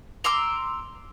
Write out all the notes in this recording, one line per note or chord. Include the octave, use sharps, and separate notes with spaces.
A#5 C6 D6 E6